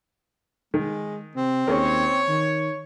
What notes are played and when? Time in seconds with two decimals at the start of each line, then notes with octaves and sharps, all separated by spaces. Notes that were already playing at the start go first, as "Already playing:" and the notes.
0.74 D#3 G#3
1.35 C3 C4
1.67 D#2 C#4 G#4 A#4 C#5
2.28 D#3